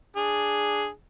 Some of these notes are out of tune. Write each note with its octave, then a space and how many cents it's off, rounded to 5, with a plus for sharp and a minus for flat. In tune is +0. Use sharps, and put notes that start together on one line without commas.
D4 +0 G#4 +0